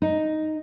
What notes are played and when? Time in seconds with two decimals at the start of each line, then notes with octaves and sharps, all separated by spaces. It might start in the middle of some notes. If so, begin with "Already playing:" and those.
0.02 D#4